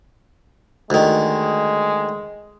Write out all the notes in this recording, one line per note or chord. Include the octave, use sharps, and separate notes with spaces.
D2 D#3 G#3